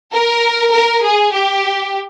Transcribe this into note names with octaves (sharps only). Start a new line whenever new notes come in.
A#4
A#4
G#4
G4